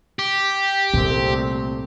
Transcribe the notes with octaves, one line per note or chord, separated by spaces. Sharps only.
G4
C2 A#2 A3 C4